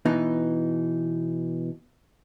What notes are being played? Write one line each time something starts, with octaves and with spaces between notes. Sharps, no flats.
B2 E3 D#4